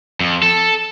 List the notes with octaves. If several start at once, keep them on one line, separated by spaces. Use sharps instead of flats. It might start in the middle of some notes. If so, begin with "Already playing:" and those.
F2
A4